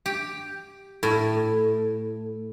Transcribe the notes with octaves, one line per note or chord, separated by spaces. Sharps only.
G4
A2